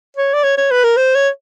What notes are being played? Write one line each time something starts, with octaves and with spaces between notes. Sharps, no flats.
C#5
D5
C#5
C#5
B4
A#4
C5
C#5